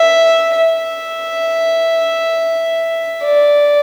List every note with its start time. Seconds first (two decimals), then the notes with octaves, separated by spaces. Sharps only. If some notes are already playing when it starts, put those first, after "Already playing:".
Already playing: E5
0.57 E5
3.24 D5